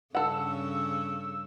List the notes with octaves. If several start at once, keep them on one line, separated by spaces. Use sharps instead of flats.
G2 C#3 C#4 A4 F#5 E6